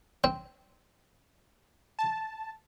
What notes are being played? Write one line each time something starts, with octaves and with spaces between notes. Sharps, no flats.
C4
A5